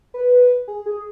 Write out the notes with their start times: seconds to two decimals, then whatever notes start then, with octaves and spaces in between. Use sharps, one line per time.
0.14 B4
0.68 G#4
0.86 G#4